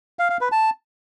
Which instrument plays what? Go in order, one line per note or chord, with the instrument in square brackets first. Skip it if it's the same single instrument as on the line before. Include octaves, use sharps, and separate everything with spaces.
[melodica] F5
F5
B4
A5